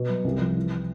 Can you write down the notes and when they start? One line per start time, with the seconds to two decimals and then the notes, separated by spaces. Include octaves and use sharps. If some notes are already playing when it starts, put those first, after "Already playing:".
Already playing: B2
0.09 F#3
0.24 C2
0.40 F3
0.56 E3